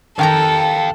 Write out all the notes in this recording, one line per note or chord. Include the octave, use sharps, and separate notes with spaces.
D#3 G4 A4 F5 G5 A#5